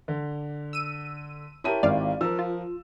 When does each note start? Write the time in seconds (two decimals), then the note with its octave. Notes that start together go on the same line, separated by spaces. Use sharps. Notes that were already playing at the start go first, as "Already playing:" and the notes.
0.08 D3
0.73 E6 D#7
1.64 E4 G4 A#4 C#5 A5 D#7
1.83 G#1 D5 F5
2.21 F3 A#4 E6
2.39 F4